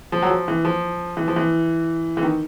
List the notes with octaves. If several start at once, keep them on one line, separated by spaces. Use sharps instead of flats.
F3
F#3
F3
E3
F3
E3
F3
E3
E3
D#3